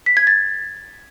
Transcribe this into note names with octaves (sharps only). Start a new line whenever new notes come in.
B6
G#6
A6